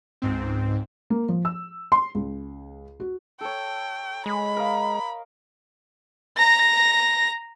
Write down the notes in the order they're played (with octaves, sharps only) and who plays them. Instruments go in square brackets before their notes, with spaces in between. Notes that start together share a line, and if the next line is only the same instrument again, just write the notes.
[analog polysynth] C#2 G#2 C4
[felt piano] A#3
F3
E6
C6
C#2
F#4
[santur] A4 C#5 [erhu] G5
[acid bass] G#3 [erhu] B5
[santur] A#4 D#5 F5
[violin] A#5 A#6